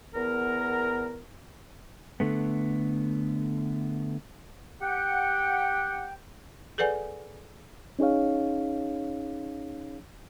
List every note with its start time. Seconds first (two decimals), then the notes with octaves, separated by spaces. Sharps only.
0.14 E2 B3 A#4
2.20 D3 A3 B3
4.81 G4 F#5 G5
6.78 G#4 A4 B4 D5 F#5 G#5
7.99 C#4 D#4 G#4 C#5 F5